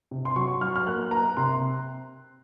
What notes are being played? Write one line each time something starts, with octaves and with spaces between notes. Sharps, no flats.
C3
C6
F#3 C#6
F#3 F6
F6
A#3 F#6
A#3 A#5
C3 C6